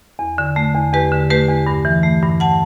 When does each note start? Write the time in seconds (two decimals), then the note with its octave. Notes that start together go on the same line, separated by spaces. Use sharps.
0.19 E2
0.38 D3
0.56 A3
0.74 E2
0.93 E2 G4 B4
1.12 D3
1.30 A3 G4 B4
1.49 E2
1.67 G2
1.85 E3
2.03 A3
2.23 G2
2.40 F#5 A5